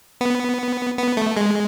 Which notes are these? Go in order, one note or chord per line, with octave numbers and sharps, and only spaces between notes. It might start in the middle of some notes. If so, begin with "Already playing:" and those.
B3
B3
A3
G#3